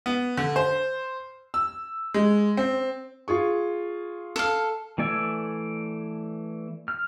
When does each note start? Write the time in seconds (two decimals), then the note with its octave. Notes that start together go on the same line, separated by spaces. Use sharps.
0.06 B3
0.37 D3
0.56 C5
1.54 E6
2.14 G#3
2.57 C4
3.28 F4 G#4 C#6
4.36 A4 F5
4.98 E3 A3 D5 G#5 E6
6.88 F6